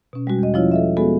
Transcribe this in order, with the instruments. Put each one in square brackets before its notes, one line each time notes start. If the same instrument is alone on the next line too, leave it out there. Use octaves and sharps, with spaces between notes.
[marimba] B2 C#4
G3 G#3 F#4
E2 D#5
F3 C#4 E4 F4 C#5 D5
A4 D#5 E5
G#3 B3 F#4 G#4 A4